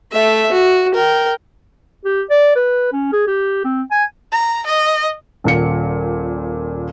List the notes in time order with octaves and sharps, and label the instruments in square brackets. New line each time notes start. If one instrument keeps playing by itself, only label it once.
[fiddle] A3 E5
F#4
A#4 G5
[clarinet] G4
D5
B4
C#4
G#4
G4
C4
G#5
[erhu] A#5
D#5
[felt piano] D#1 A#2 C#7